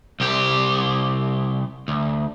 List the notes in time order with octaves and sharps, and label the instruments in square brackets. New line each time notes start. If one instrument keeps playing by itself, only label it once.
[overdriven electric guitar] C2 G4
D2